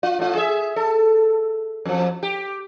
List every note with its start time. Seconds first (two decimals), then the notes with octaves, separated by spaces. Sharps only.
0.03 F4
0.19 A2 F4
0.35 G#4 E5
0.76 A4
1.85 F2 F3
2.23 G4